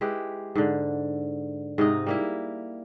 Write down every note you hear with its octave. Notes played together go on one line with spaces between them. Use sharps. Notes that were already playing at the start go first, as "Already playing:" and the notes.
G#3 E4 G4 B4
G#2 D3
G#2 C3 D#4 D#5
G3 A#3 E4